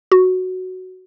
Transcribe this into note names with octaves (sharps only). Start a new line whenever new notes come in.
F#4